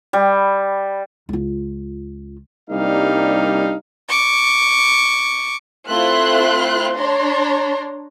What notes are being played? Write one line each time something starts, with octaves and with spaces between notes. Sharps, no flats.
G3
C#2 F4
C2 G3 A#3 D4 D#4 F5
C#6 D6
A3 C4 E4 F4 C6 F#6
D4 C#5 D5 A#5 C6